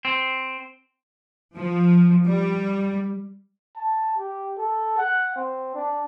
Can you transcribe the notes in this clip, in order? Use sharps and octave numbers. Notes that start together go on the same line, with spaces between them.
C4
F3
G3
A5
G4
A4
F#5
C4
D4